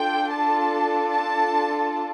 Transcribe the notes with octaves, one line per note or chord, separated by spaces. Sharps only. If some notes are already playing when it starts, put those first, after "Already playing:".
Already playing: D4 F4 A4 G5
A5
A5